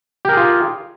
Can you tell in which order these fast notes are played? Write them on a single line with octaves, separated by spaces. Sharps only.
G4 A#4 G#4 F4